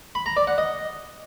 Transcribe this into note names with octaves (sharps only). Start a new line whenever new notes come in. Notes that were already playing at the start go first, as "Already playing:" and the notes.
B5
A#5
D5
F#5
D#5